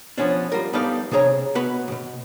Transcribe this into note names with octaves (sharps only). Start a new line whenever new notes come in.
F3 F#3 B3 C#4 D4
G3 F4 A#4
G3 B3 D#4 A4 D5 F5
C3 D4 G#4 C#5 A#5
B3 F#4 B4
B1 B2